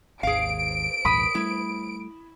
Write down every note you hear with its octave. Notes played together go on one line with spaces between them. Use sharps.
G#1 D#2 G#4 F5 D7
A#1 D#2 G#2 B5 D#6
G3 A3 E4